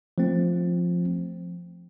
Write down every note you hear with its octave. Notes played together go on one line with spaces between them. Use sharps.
F3 A3 C4